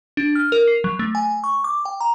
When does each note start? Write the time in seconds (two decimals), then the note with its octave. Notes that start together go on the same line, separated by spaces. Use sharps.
0.17 D4
0.35 F6
0.52 A#4
0.68 C7
0.84 F#3
0.99 A3
1.15 G#5
1.44 C#6
1.64 D6
1.85 G5
2.01 A#5